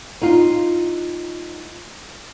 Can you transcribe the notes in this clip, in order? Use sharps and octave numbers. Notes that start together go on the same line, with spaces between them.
D#4 F4